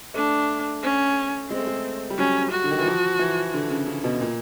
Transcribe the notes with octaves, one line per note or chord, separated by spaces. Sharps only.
A3 D4
C#4
G#3 C4
A3
G#3
G3
F#3 C#4
F#4
D3
D#3
E3
F3
E3
D3
C#3
C#3
B2
A#2